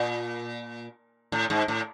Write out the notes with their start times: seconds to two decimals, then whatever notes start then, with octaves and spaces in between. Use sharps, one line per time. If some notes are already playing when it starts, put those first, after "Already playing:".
Already playing: A#2
1.32 A2
1.50 G#2
1.68 A2